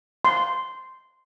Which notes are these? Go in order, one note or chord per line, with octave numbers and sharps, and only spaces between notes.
C6